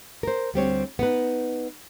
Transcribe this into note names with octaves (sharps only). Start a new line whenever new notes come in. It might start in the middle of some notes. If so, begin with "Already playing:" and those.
A#4 C5
D2 G3 C4 C#5
B3 D#4 B4